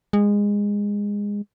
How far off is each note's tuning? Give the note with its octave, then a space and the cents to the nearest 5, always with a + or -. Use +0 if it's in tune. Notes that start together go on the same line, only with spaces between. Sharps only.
G#3 -20